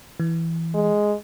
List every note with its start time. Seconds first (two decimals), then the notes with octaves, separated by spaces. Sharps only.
0.20 E3
0.74 G#3